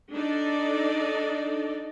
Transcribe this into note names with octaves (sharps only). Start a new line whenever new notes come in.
D4 D#4 A4 D5